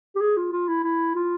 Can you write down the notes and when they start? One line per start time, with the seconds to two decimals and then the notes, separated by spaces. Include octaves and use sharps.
0.15 G4
0.21 G#4
0.37 F4
0.52 F4
0.68 E4
0.84 E4
1.16 F4